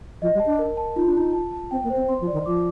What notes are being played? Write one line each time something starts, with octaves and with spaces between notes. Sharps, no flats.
F3 D#5
G3
A5
D4
A#4
A5
D#4 F4
D4
D#4 F4
A5
A5
C4 G5
A#3
C5
C4
C4 C6
F3
D5
D#3
F3 D6